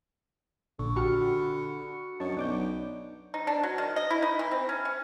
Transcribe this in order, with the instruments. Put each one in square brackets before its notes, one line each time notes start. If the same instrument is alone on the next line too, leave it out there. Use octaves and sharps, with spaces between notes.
[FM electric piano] A#1 A#2 [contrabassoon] D3 [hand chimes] C#6
[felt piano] F#4 [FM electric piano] G4 A5 C#7 [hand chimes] B5 C#6 F6
[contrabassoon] F#2 [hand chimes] D4 C#5 D#5 [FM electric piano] A5 C#6
[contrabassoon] B1 [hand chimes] D5 [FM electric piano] F#5 D6 G6
[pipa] D#4
D4
F#3
D#3
D#5
E4
D#4
E3
C4
C#4
C#4